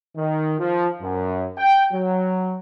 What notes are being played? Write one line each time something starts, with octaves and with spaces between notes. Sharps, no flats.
D#3
F3
F#2
G5
F#3